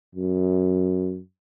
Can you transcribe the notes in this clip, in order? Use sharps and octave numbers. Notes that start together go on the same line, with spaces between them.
F#2